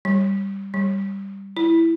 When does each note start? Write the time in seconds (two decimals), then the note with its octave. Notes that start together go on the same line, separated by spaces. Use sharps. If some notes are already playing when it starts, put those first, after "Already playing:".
0.05 G3
0.74 G3
1.57 E4